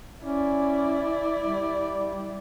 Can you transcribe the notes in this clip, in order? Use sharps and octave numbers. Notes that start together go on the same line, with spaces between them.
C#4 E4 D5
G3